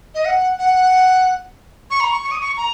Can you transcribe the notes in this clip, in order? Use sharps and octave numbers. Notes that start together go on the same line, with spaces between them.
D#5
F#5
F#5
C#6
A#5
C#6
C#6
D#6
C#6
A#5